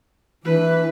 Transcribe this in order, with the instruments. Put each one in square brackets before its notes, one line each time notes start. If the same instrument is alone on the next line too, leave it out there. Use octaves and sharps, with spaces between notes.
[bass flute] E3 [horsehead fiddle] D4 B4